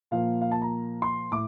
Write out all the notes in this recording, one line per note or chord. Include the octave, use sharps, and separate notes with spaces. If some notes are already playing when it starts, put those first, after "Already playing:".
A#2 F3 A#3 F5
F5
A5
A#5
C6
A2 D6